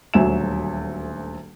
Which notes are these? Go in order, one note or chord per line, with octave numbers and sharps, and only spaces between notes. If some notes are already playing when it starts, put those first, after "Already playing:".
D#1 D2 F#3 E5 G#5 E7